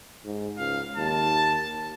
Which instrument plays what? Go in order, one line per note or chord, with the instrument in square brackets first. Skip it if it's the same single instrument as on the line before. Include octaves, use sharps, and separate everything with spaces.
[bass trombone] G#2
[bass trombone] C#2 [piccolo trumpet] F5
[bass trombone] D#2 [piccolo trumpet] A5